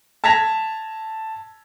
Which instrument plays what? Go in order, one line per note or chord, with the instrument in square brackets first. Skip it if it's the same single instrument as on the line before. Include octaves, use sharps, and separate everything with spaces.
[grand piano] A5 G#6 A#6 B6 F7